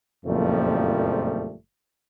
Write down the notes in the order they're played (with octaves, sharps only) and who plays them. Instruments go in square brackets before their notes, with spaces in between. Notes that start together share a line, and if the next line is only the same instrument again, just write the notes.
[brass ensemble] F#1 F2 A#2 F3 G3 A3